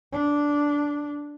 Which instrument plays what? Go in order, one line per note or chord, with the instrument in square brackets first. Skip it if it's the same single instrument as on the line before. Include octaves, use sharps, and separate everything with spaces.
[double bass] D4